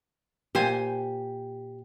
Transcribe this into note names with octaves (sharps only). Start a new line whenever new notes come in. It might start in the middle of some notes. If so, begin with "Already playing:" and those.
A#2 G4 C5 G#5